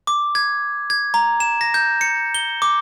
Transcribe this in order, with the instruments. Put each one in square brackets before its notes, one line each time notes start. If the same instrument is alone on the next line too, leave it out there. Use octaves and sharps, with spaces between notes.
[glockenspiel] D6
G#6
G#6
A#5
E7
A#6
G6
C#7
G7
D6